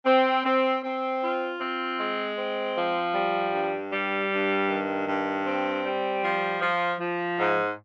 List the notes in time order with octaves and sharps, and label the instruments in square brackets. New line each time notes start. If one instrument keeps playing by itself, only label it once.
[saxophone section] C4
C4
C4
F4
C4
G#3
C4
F3
G3
G2
G3
G2
D#3
G2
C4
G3
F3
F3
F3
G#2